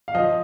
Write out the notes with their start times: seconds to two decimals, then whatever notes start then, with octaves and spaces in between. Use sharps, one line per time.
0.08 F5
0.15 F3 D#5